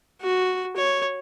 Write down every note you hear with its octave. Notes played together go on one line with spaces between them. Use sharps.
F#4
C#5